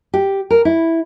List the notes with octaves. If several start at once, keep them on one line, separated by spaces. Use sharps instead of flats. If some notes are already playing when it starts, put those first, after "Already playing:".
G4
A#4
E4